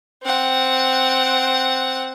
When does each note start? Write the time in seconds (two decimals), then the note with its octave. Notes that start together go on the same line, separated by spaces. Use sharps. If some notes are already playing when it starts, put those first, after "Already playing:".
0.23 C4 F#5